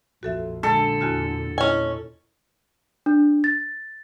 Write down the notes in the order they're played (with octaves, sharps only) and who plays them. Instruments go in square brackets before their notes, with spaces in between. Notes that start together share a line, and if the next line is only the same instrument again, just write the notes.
[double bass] A#1 F2 [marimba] F#4 A4 E5
[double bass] A#2 D3 [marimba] G#3 [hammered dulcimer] A4
[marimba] E2 F#4 F6
[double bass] A#2 [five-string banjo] C#4 G#5 [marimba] E4 D#5
[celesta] D4
A6